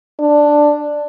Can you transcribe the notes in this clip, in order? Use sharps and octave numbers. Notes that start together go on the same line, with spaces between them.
D4